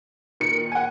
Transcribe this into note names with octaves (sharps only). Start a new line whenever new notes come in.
A#2 D#3 C#7
F#5 G#5